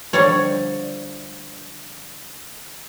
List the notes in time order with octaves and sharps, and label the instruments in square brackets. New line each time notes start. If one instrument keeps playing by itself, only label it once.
[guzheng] D3 F3 [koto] G3 C#5